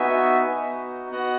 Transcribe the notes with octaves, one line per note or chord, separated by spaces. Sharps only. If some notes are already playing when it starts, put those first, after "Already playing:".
Already playing: B3 D#4 F#4 E5 G#5
B3 D#4 F#4
B3 F#4 D#5 F#5